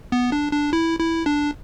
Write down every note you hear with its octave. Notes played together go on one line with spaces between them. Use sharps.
B3
D4
D4
E4
E4
D4